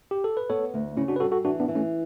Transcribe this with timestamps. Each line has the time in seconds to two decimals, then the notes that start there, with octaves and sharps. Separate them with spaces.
0.11 G4
0.24 A4
0.37 B4
0.50 B3 A4 C#5
0.74 D2
0.97 C#3 C#4 E4
1.08 D4 F#4
1.16 B4
1.20 G3 F#4 A4
1.32 F#4 A4
1.44 E3 D4 F#4
1.60 B3 D4
1.68 E3
1.75 A3 C#4